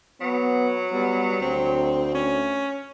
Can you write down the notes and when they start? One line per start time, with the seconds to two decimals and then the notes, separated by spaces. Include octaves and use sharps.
0.21 F#3 B3
0.91 G3 B3
1.41 D2 C4
2.15 C#4